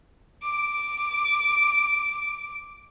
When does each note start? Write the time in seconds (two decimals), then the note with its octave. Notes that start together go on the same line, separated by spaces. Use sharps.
0.42 D6 D7